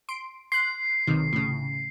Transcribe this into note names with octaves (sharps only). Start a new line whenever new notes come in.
C6 D7
C6 F#6 C7
B1 C3 D#3
A2 C#3